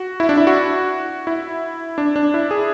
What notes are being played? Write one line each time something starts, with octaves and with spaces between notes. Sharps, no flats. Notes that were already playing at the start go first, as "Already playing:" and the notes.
Already playing: F#4
E4
D4
E4
F#4
E4
D4
D4
E4
G#4